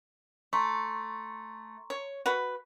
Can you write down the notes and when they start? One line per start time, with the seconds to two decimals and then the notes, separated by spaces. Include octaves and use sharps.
0.53 A3 A#5 C6 C#6
1.90 C#5
2.26 F#4 B4